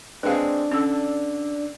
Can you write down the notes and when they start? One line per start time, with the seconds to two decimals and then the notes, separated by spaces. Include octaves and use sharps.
0.23 G#3 C4 D4 G#4 B4 F5
0.72 D3 C#4 E6
0.88 D4